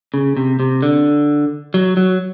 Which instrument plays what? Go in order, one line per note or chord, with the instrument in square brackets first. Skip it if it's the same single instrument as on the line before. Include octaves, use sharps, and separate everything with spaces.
[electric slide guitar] C#3
C3
C3
D3
F#3
F#3